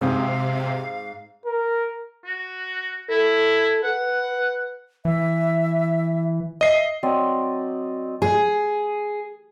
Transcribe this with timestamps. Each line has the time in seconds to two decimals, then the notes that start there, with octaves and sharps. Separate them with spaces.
0.01 G#1 G#2 C3 C4 F5 D#6
1.46 A#4
2.24 F#4
3.10 E4 A4
3.84 B4 F#5
5.05 E3 E5
6.61 D#5 E5 C7
7.03 F#3 C4 D5 D#5
8.22 G#4